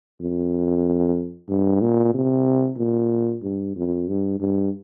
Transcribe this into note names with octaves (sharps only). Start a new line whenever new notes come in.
F2
G2
A#2
C3
A#2
G2
F2
G2
G2